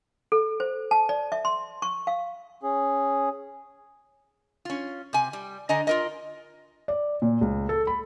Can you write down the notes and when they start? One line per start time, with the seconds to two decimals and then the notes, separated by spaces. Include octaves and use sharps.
0.32 A4
0.60 C5
0.91 A5
1.09 D5
1.32 E5
1.45 C6
1.82 C#6
2.07 F5
2.63 C#4 G#4
4.65 C#4 F4
5.13 C3 G#5
5.33 G3
5.69 D3 D#5 G#5 A#5
5.87 F4 A#4 D#5
6.88 D5
7.22 A#2
7.41 C#2
7.69 A4
7.87 B5